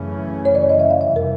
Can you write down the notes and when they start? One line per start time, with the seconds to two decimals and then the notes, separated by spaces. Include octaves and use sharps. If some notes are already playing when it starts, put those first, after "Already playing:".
Already playing: F#2 C#3 E3 A3 C#4
0.45 C#5
0.55 D5
0.70 D#5
0.80 E5
0.90 F5
1.00 F2 C3 E3 G3 E5
1.16 A#4